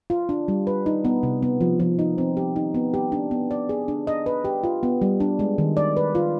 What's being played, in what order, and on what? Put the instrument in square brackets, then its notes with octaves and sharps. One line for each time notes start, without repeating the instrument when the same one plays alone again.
[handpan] F4
D4
G3
B4
D#4
B3
C3
B3
F3
F3
D#4
C4
G4
D#4
B3
G4
D4
B3
D5
G#4
D4
D#5
B4
G4
F4
B3
G3
D4
G#3
D#3
D5
B4
F4